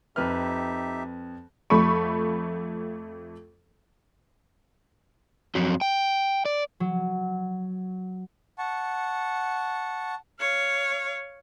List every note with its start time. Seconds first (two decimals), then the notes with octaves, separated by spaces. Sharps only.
0.16 F2 D#4 G4 B4 E5 F6
1.70 F2 A3 B5 C#6
5.55 F2 F#3
5.81 G5
6.45 D5
6.80 F#3
8.58 F#5 A5 C#6
10.40 C#5 F5